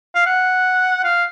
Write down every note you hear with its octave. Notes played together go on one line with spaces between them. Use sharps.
F5
F#5
F5